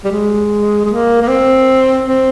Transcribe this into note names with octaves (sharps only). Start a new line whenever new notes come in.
G3
G#3
G#3
A#3
A#3
C4
C4